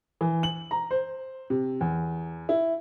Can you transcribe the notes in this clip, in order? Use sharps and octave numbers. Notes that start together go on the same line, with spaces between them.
E3
F#7
A#5
C5
C3
E2
E4